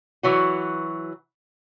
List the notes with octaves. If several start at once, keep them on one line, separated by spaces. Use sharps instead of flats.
E3 F#3 F#4